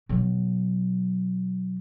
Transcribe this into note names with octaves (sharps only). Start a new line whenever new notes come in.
B2 F#3